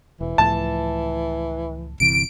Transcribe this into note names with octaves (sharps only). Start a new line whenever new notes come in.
E1 E3
C#2 A2 F3 A5
G1 C3 E3 D7